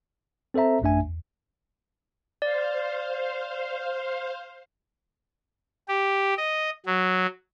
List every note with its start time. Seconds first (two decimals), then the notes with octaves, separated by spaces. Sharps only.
0.54 C4 A4 C5 E5 A#5
0.82 A1 F#2 A3 D4 E5 G#5
1.03 E2
2.42 C5 D5 F5
5.88 G4
6.38 D#5
6.86 F#3